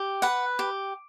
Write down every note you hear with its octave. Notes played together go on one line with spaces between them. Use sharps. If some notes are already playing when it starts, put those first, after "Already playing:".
Already playing: G4
B4 F#5
G4